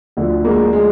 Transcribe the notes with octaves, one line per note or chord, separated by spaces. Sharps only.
D2 D3 F3
G#3 A#3
G#3